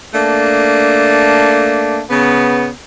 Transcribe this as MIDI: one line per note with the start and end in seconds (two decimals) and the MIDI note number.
0.14 2.02 57
0.14 2.02 58
0.14 2.02 62
2.10 2.69 49
2.10 2.69 59